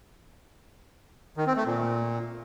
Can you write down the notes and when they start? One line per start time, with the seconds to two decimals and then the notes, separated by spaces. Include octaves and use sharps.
1.37 D#3
1.47 C4
1.56 A3
1.66 A#2